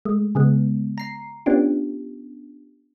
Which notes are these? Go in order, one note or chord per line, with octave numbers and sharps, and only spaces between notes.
G#3 A3
C#3 G#3 B3
A#5 C7
B3 C#4 D4 F4 G4